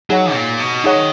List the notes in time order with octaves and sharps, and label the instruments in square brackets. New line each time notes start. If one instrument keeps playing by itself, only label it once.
[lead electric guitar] F#3 [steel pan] D#4 G#4 C#5 F#5
[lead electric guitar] A#2
B2
[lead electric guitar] D#3 [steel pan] D#4 G#4 C#5 F#5